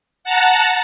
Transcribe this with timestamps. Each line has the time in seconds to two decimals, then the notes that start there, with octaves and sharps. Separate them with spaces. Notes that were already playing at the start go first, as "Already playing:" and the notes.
0.24 F#5 A5 A#5